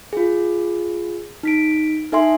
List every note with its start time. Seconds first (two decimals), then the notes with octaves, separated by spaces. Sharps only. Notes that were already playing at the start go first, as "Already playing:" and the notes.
0.13 F4 G#4
1.43 D#4 B6 D7
2.12 D#4 A4 E5 G#5 C6